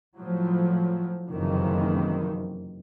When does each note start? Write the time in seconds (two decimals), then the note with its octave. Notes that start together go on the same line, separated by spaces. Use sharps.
0.16 A2 F3 F#3
1.29 F#1 F2 C3 D#3 E3